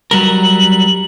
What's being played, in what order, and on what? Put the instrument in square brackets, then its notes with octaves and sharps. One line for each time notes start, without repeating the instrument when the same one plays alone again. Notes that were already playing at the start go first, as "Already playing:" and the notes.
[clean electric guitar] F#3 G3 A#4 [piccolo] F#7